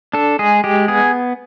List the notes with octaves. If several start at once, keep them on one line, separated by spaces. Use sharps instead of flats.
D4 A4
G#3 G#4
G#3 G4
B3 G#4